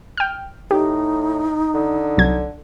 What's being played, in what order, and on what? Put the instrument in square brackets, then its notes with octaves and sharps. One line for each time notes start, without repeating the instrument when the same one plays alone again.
[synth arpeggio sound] G5 F6
[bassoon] A2 [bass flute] D#4 [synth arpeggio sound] G4
[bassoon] D3
[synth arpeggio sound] C2 F#3 G#6